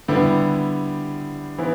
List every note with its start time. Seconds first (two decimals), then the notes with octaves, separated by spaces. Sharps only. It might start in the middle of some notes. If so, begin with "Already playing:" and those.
0.08 D3 G3 B3 E4 G4
1.58 E3 B3 E4